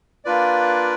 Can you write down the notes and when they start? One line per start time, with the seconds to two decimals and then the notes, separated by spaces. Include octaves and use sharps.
0.25 A#3 D4 F4 B4 D5